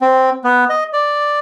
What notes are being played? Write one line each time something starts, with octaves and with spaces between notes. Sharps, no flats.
C4
B3
D#5
D5